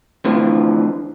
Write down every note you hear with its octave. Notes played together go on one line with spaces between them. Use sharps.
A2 D3 E3 F3